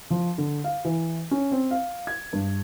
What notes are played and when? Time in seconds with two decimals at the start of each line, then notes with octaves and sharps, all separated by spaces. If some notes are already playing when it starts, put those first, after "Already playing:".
0.10 F3
0.38 D3
0.64 F5
0.85 E3
1.31 C#4
1.51 C4
1.71 F5
2.07 G#6
2.33 G2